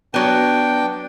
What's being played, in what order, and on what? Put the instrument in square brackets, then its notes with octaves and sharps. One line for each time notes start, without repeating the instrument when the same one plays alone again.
[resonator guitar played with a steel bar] F#3 B3 [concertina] D4 G5